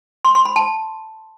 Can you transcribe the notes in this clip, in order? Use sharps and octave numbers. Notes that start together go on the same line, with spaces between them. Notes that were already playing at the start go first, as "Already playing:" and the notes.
C6
C6
B5
A5